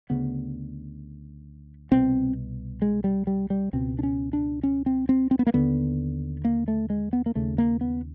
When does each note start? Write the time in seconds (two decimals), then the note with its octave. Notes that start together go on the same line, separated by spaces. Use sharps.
0.10 D2 C#3 B3
1.91 C2 B2 C4
2.82 G#3
3.04 G3
3.27 G3
3.50 G3
3.73 C#2 B2 C4
3.99 D4
4.03 C#4
4.33 D4
4.63 C#4
4.86 C4
5.09 C4
5.31 C4
5.39 B3
5.47 A#3
5.54 D#2 D3 B3
6.45 A#3
6.68 A3
6.90 G#3
7.13 B3
7.26 A#3
7.35 D#2 C#3 A3
7.58 A#3
7.81 B3